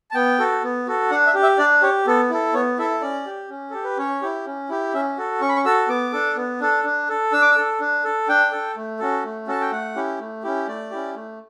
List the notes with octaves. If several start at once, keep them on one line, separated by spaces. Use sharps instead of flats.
A5
B3 G5
F#4 A4
B3
F#4 A4
D4 F#5
E5
G4
E5
D4 D5
G4 C#5
B3 A4
E4 A4
B3 C#5
E4 A4 E5
C#4 D5
G4
C#4
G4 A4
B4
C#4 C#5
E4 G4
C#4
E4 G4
C#4 E5
F#4 A4
C#4 C#6
B5
C#6
F#4 A4 E6
B3 D6
D4 A4
B3
D4 A4
D4
A4
D4 E6
D6
E6
A4
D4
A4
D4 G5
A4
A3
C#4 F#4 A4
A3
C#4 F#4 A4 A5
G5
A3 F#5
C#4 E4 G4
A3
C#4 E4 G4
A3 D5
C#4 E4 G4
A3